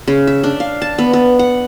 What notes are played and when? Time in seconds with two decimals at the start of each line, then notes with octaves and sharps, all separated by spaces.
0.07 C#3
0.27 E5
0.43 D4
0.60 F5
0.82 A5
0.98 B3
1.13 B3
1.39 F#5